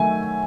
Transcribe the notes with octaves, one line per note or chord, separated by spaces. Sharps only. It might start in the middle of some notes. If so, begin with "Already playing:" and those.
Already playing: D#3 F#3 A3 E5 G#5